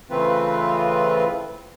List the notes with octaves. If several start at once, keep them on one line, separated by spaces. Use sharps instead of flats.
C#3 E3 A3 C4 F4 B4